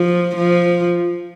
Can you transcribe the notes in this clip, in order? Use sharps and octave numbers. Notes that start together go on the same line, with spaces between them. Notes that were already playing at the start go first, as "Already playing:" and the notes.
Already playing: F3
F3